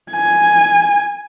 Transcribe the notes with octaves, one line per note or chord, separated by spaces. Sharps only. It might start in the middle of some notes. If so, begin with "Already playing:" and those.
G#5